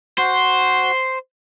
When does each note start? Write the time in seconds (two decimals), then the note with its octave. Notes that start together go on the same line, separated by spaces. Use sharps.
0.18 F#4 C5